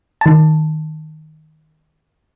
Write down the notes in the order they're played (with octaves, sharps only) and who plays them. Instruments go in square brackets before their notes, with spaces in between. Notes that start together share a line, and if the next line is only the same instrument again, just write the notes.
[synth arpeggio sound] D#3 A5